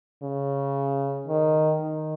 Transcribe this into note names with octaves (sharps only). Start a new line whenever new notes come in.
C#3
D#3
D#3